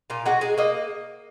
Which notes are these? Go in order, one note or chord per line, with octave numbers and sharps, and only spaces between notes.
A#2 F4
G#3 F#4
G#3 G#4
A#3 D#5